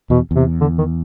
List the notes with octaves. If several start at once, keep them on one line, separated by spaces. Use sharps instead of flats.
E2 B2
E2 C3
D3
D#3